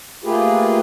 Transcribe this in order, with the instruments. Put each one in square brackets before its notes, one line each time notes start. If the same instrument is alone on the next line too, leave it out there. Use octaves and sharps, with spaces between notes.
[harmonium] A3 A#3 F4 G4 G#4 B4